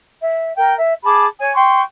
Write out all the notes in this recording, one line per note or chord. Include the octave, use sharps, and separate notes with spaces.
E5
A#4 G5
E5
G#4 A5 B5 D6
C#5 G#5
G5 C6 C#6